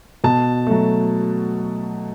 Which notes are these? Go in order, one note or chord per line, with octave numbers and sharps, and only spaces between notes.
B2 A5
F#3 A3